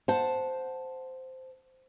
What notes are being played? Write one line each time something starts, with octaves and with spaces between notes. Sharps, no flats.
C5 F#5 A5